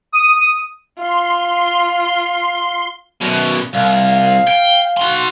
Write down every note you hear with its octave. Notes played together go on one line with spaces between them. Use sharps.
D#6
F4 C6
F#2 B2
C2 F5
G5
F#4 C6